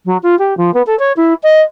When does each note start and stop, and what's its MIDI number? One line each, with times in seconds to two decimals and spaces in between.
0.06 0.18 54
0.23 0.38 65
0.39 0.57 67
0.57 0.73 53
0.74 0.82 59
0.86 0.97 69
0.99 1.12 73
1.17 1.34 64
1.43 1.61 75